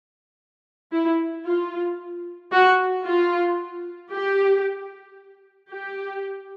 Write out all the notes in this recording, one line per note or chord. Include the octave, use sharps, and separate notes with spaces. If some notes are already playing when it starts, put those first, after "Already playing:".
E4
F4
F#4
F4
G4
G4